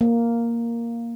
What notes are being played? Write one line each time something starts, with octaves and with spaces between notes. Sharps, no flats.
A#3